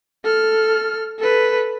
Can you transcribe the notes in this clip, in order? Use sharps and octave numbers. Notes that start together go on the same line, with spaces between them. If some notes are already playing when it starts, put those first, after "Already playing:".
A4 F6
A4 B4